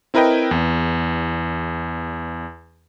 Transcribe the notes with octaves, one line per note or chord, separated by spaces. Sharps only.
C4 E4 A#4 B4 D#5 G5
E2